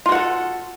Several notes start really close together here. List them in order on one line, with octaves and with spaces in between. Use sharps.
F4 F#4 F#5 A4